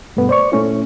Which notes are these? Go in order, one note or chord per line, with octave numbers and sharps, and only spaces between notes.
G2 B2 A3 B3
C5 D5 C#6
A#2 A3 C#4 E4